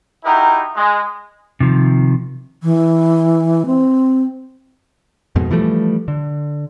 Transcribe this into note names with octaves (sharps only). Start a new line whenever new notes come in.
D#4 E4 F#4 G4 A#4
G#3
C3 D#3 F3
E3
C4
F2 G#2 B2
E3 F3 G3 A3
D3